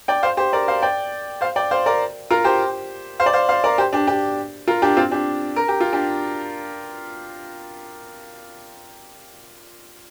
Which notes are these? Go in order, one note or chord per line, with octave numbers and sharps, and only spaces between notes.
D5 G5
C5 F5
G4 C5
A#4 D5
C5 F5
D5 G5
C5 F5
D5 G5
C5 F5
A#4 D5
F4 A#4
G4 C5
C5 F5
D5
C5 F5
C5 F5
A#4 D5
G4 C5
D4 G4
D4 G4
F4 A#4
D4 G4
C4 F4
D4 G4
A#4
G4
F4
D4 G4